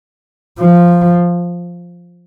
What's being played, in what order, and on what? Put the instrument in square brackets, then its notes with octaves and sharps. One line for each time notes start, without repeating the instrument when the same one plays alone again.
[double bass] F3